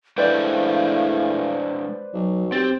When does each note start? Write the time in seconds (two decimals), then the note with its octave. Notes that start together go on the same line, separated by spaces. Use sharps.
0.18 A2 G#3 D4 B4 C5 D5 F5 G5
2.14 B1 F#3
2.52 C4 G4 A6